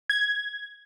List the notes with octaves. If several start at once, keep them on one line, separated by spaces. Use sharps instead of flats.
G#6